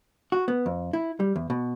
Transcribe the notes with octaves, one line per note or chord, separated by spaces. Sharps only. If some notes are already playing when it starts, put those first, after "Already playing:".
F#4
B3
F2
E4
G3
E2
B2